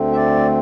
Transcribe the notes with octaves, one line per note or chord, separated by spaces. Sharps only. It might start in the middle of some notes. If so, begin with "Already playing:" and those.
Already playing: D2 D3 A3 C4
E5
D5